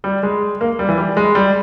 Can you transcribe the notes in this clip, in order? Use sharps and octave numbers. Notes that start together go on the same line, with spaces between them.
G3
G#3
A#3
G3
E3
G3
G#3
G3